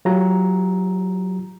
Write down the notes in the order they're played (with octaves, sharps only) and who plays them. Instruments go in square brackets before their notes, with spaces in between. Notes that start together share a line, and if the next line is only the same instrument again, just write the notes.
[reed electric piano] F#3 F4 G4 A#5